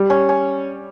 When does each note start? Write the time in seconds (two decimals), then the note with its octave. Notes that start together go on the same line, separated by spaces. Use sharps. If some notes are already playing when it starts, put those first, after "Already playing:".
Already playing: G3
0.10 C#4
0.29 C#4